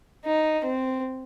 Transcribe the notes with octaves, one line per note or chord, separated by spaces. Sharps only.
D#4
C4